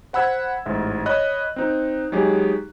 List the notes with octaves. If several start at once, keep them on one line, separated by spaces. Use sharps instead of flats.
C5 F#5 B5 E6 G#6
A1 G#2 E5
C#5 D#5 B5 F#6
C4 D#4
F#3 G#3 D#4 G4 G#4